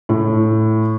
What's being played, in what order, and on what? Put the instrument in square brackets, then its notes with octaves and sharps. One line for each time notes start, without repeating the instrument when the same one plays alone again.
[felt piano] A2